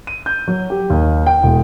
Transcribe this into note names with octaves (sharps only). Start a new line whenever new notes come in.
D#7
G6
F#3
G4
D#2
G5
E1